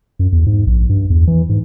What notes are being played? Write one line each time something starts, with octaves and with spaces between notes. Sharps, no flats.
F#2
E2
G#2
A#1
G2
E2
E3
G#2